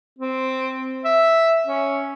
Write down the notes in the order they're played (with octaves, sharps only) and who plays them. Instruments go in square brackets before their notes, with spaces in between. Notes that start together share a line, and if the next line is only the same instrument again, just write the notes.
[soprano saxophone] C4
E5
C#4